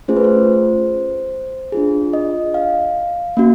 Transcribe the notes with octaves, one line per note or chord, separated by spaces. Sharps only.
A3 C#4 F4 G#4 C5
B4
C5
D4 F4 G#4
D#5
F5
A#3 C#4 F#4